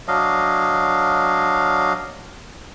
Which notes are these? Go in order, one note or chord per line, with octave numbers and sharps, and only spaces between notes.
F#3 D4 D#5 F5